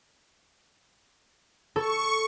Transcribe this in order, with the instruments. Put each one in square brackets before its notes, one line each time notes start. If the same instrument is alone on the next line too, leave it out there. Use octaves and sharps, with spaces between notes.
[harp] A4 [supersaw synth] C#6